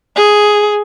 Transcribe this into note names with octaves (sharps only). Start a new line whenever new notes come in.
G#4